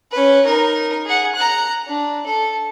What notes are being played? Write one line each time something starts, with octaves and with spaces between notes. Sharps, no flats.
C#4 B4
D#4 A#4
G#4 F#5
A#5 F#6
D4
A4